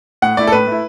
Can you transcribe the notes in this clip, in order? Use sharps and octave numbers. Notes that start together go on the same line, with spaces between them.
A2 F#5
A3 E4 D5
A4
A2 B4
A3 E4